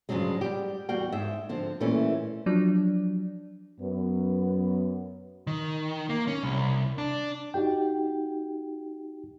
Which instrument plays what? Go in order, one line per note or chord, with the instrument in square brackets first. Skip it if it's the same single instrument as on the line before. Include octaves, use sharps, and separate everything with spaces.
[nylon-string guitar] G2 A#2 C#3 F3 F#3 G#3
G3 G4
E2 G3 F#4 F5 G5
G#2 E5
D3 F3 C4
A#2 E3 G3 A3 C#4 E4
[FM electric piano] F3 F#3 D4
[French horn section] F#2 B3
[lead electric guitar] D#3
A#3
C#4
C2
D4
[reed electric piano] D#4 F#4 G4 G5